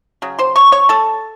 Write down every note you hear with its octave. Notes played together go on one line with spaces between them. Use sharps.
C#3 F#3
C5 C6
C#5 C#6
C#5 C#6
A4 A5